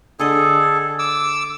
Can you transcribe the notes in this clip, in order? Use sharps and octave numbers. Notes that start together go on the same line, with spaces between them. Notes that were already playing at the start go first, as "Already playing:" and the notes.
D3 G#4 A4 D#5
D6 E6